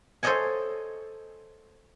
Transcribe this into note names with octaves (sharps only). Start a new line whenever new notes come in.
A4 C5 C#5 D#5 F#5 G#5